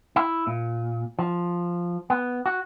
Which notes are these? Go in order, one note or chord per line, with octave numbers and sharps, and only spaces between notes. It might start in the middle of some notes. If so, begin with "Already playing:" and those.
E4
A#2
F3
B3
F#4